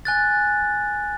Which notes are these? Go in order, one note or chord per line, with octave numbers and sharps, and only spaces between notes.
G#5 F#6 A6